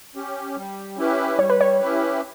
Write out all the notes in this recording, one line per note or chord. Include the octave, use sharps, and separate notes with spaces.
C#4 G4
G3
C#4 E4 G4 B4
G3 C#5
B4
C#5
C#4 E4 G4 B4